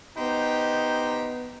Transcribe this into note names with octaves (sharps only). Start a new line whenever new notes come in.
B3 D#4 G4 C5 G5